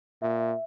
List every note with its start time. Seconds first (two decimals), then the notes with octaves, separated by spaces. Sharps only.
0.22 A#2 E5
0.40 E5